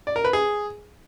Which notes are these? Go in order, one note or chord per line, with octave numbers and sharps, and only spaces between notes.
D5
A#4
B4
G#4